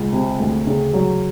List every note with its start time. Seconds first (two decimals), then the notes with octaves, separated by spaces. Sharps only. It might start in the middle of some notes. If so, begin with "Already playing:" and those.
Already playing: C#2
0.12 C3
0.40 D2
0.67 C#3
0.93 F#3